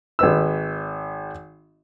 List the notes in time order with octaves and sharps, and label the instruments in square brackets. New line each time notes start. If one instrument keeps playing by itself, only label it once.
[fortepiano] G#1 B4 E6